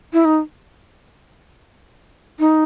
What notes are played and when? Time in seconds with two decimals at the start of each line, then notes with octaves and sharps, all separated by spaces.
0.13 E4
0.25 D#4
2.40 D#4